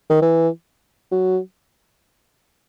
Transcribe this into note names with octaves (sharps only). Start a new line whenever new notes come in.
D#3
E3
F#3